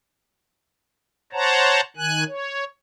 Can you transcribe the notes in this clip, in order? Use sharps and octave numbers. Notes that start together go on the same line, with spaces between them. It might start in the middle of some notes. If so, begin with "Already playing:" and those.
C5 C#5 F#5 A5 A#5
D#3 G#5 F#6
C#5